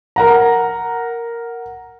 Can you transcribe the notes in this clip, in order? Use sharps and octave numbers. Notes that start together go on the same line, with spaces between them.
A#4 F#5 A#5